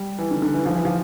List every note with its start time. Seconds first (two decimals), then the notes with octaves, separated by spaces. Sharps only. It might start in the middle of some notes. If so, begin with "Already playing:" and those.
Already playing: G3
0.19 E3
0.31 D3
0.42 D3
0.54 E3
0.66 F3
0.75 E3
0.85 F3